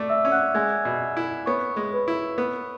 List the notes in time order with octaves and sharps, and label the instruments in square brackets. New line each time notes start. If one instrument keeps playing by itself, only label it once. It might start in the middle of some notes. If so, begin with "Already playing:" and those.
Already playing: [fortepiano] A3 [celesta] D5 D6
[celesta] E5 E6
[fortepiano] C#4
[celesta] F#5 F#6
[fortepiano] G#3 [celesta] G#5 G#6
[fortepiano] B2
E4
[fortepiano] B3 [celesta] C#5 C#6
[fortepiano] G#3
[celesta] B4 B5
[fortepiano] E4
B3